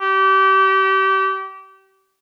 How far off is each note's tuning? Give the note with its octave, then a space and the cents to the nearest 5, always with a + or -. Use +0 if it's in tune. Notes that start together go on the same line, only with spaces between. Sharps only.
G4 -30